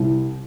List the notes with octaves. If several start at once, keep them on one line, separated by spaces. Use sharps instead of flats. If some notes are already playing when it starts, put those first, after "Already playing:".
Already playing: C2